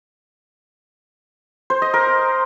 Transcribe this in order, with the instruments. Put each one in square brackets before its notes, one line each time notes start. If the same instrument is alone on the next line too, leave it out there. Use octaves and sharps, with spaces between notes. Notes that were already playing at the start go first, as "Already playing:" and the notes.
[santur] C5
D#5
A#4